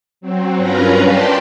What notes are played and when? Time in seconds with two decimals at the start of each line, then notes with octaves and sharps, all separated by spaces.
0.21 F#3 C4
0.57 G2 C#4 F4 A#4 B4 A#5
1.03 D5 G5 A5 B5 C6